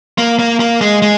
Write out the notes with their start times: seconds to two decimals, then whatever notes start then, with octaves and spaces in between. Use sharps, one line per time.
0.18 A#3
0.39 A#3
0.60 A#3
0.81 G#3
1.02 G#3